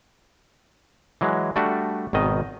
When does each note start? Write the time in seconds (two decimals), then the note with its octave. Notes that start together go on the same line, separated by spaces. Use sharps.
1.21 E3 F#3 G#3
1.56 G3 A3 D4 F#4
2.13 G#1 B2 D#3 D#5